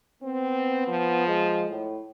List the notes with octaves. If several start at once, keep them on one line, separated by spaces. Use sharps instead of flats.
B3 C4
F3
G#3
A2